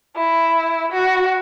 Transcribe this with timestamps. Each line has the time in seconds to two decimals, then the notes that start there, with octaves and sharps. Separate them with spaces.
0.16 E4
0.92 F#4